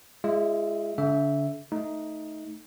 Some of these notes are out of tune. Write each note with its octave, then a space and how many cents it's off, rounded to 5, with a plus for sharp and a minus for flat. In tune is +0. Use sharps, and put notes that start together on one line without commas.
G#3 +0 F4 -40 E5 +0
D3 -40 E5 +0
A3 +0 D#4 +5